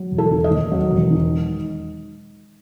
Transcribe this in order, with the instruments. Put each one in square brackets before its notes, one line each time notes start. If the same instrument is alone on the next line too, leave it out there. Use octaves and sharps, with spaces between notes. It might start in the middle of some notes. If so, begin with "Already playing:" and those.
Already playing: [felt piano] F#3
E1
A4
D#3
D#5
D#2
F#3
E1
D#3